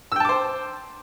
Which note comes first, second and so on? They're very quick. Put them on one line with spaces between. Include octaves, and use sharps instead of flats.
E6 G5 A5 D6 C5